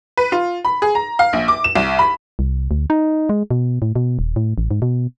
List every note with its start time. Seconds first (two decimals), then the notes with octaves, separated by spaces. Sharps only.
0.17 B4
0.32 F4
0.65 B5
0.82 G#4
0.95 A#5
1.19 F5
1.33 A#1
1.48 D6
1.64 E7
1.75 C2
1.99 B5
2.39 C2
2.71 D2
2.90 D#4
3.29 G#3
3.51 B2
3.82 A2
3.96 B2
4.19 D#1
4.36 A2
4.58 A1
4.71 G#2
4.82 B2